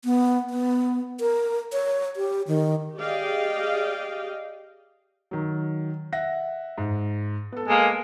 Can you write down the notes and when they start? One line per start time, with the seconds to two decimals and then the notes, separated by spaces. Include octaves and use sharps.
0.05 B3
0.50 B3
1.20 A#4
1.73 C#5
2.16 G4
2.48 D#3
2.96 G4 G#4 D5 D#5 F5 G5
5.31 D#3 F#3
6.12 E5 F#5 A#6
6.78 G#2
7.52 B3 A4
7.69 G#3 A#3